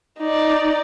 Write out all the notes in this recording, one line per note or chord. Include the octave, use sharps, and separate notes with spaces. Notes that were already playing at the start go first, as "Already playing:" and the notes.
D#4 D5